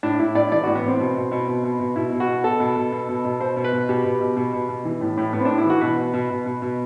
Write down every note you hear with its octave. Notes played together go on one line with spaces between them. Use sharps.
A2 D4
A2 E4
A2 D5
E3 D5
A2 F#4
B3
A2 C4
B2
B2
B2
B2
B2
B2
B2 E4
B2
F#4
B2
B2 A4
B2
B2
B2
B2
B2
B2 C5
B2
B4
B2
B2 G4
B2
B2
B2
B2
B2
E3
A2
A2
A2 B3
C4
A2 D4
E4
E3 F#4
B2 B4
B2
B2
B2
B2
B2